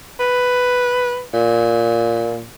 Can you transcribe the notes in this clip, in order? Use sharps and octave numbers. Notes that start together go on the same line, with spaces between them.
B4
A#2